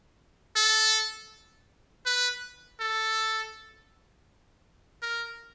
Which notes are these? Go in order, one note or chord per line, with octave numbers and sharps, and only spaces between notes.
A4
B4
A4
A#4